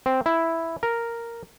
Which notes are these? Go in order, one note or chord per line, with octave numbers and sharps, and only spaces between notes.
C4
E4
A#4